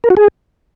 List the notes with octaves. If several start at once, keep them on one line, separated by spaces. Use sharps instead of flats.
A#4
F#4
G#4